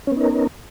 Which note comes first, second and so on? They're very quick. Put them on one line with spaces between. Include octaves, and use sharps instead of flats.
C#4 B3 D#4 A#4